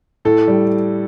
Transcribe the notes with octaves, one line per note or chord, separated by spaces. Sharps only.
A2 A4
G3